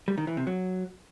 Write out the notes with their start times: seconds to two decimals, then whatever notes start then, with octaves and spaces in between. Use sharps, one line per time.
0.08 G3
0.18 D#3
0.27 E3
0.37 C3
0.47 F#3